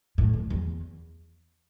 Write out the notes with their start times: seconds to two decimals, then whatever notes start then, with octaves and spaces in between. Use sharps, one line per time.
0.18 A2
0.34 E2
0.50 E2